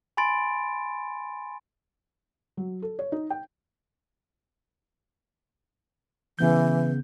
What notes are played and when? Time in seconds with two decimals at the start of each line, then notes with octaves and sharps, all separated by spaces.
0.17 G#5 B5 C6 A6 D7
2.57 F#3
2.82 A4
2.99 C#5
3.12 D#4
3.30 G5
6.39 C#3 E3 B3 G6